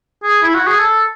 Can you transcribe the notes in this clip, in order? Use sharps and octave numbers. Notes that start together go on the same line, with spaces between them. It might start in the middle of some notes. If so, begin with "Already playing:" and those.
G#4
E4
F#4
G#4
A4